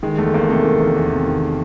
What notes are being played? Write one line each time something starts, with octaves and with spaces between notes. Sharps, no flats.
D#3 G#3
E2 A3
E2 A#3
C3 A3
D#3
E2
E2
C3
D#3